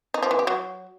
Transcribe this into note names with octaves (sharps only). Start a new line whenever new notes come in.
D#4
F3
E3
G4
F#3